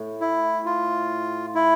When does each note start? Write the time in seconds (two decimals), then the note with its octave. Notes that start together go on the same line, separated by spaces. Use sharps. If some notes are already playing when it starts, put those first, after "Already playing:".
Already playing: A2
0.21 E4
0.66 F4
1.55 E4